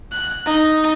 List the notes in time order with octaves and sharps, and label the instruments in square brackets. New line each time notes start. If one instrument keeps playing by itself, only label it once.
[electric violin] F#6
D#4